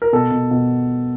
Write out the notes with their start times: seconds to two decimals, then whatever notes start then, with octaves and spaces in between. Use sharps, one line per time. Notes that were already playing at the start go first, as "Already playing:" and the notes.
0.02 A#4
0.13 B2 A4
0.32 B2
0.51 B2